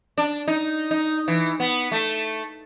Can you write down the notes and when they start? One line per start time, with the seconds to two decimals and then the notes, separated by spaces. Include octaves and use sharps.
0.18 D4
0.48 D#4
0.91 D#4
1.28 E3
1.60 B3
1.92 A3